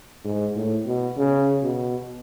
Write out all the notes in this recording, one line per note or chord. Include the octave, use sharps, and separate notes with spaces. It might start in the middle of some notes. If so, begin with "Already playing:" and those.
G#2
A2
B2
C#3
B2